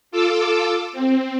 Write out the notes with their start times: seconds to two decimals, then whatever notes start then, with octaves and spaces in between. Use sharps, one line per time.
0.11 F4 A4 D6 E6
0.93 C4